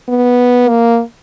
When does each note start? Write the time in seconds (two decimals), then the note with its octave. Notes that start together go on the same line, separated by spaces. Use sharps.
0.08 B3
0.69 A#3